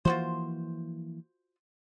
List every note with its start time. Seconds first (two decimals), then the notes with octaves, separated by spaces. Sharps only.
0.05 E3 F3 A#3 F4 F#4 C5